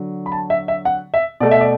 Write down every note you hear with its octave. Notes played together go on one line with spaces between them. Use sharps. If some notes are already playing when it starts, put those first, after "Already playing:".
Already playing: D3 F#3
B5
A5
E5
E5
F#5
E5
B2 A3 D5
E5
D5